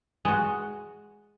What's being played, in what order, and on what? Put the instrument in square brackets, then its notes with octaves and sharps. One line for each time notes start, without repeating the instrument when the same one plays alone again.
[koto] G#3 F#4